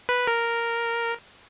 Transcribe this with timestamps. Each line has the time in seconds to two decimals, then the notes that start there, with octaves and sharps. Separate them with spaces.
0.09 B4
0.27 A#4